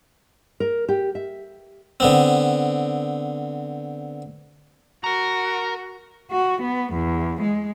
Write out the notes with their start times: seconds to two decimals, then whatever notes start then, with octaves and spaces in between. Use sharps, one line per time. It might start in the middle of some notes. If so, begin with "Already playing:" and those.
0.60 A#4
0.89 G4
1.15 E5
2.00 D3 B3 C4
5.04 F#4 A#4 A#5
6.31 F#4
6.61 B3
6.93 E2
7.42 G#3